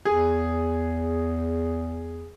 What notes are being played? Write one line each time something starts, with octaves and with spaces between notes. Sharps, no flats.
E2 G#4